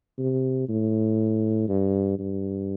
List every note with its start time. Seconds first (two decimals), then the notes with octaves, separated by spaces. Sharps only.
0.18 C3
0.68 A2
1.69 G2
2.19 G2